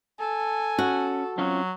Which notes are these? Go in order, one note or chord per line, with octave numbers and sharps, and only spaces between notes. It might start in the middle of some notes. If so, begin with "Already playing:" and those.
A4 G#5
C#4 F#4
F#3 C4 C#4 F4